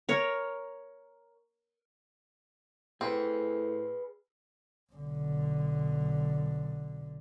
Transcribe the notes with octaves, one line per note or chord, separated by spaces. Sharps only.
A#4 C#5
A2 C4 G#4 B4
B1 D3